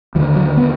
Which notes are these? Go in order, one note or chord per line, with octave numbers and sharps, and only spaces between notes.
D#2 D3 F3
F#3
B3